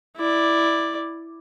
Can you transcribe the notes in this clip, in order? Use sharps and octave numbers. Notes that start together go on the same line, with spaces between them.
E4 D5